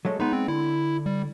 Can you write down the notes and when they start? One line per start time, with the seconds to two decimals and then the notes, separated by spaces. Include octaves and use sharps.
0.05 F#3 G#3 A3
0.20 G#3 B3 D#4 B4
0.33 C4
0.48 D3 E4
1.06 G3